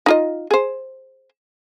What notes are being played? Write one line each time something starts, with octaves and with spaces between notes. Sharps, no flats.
D#4 F4 D#5
G#4 C5